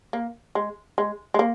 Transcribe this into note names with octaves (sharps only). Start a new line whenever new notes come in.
A#3
G#3
G#3
G#3
A#3